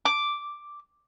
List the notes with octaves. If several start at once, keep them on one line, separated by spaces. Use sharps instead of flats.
D6